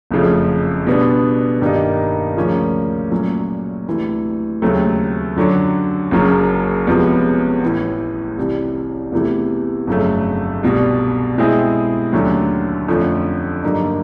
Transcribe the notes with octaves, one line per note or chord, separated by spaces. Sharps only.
F#1 F2 C#3 F3 A3
B2 G3 B3 D4
G2 D#3 G3 A#3 D#4
D2 C#3 F3 A#3 C#4
A#2 F#3 A3 C#4
D2 C3 E3
D#2 C#3 F#3 A3 C4
F#2 D3 F#3
F#1 F#2 C#3 F#3 A#3
E2 C3 F3 G#3 B3
A1 A2 E3
C2 C3 E3
E2 C3 E3 A3
G1 F2 C#3 F#3 A3
C2 B2 G3
B2 G#3 C4 E4 G#4
D#2 D3 F#3 A3 C#4
F2 D3 F3 A3 C#4
G2 D3 F#3 A#3 D#4